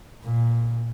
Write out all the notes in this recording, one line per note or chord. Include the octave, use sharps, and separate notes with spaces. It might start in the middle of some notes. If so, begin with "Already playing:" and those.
A#2